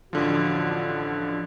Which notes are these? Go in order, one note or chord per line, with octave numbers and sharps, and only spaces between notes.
A1 D3 F3 F#4